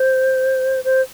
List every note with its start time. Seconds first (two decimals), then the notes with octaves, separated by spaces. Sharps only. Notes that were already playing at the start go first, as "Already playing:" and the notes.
Already playing: C5
0.84 C5